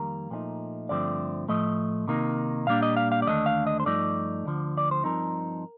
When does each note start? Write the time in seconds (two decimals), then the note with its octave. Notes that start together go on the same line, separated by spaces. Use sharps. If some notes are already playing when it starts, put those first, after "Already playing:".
Already playing: F2 D#3 G3 A#3 A#4
0.30 A#2 F3 A3 C4 D#4
0.89 G2 D3 F3 A3 C4 D5
1.48 A2 F3 A3 D#5
2.08 C3 D#3 A#3 D#4
2.67 A#2 G3 A#3 D4 F5
2.82 D#5
2.97 F5
3.12 F5
3.22 D5
3.27 D#2 D3 A3 D4 D#5
3.46 F5
3.67 D#5
3.80 C5
3.86 G2 F3 A3 D#4 D5
4.45 D2 D3 F3
4.77 D5
4.91 C5
5.04 G2 F3 C4 D#4 A#4